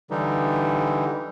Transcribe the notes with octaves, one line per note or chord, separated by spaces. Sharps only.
D3 E3 G3 D#4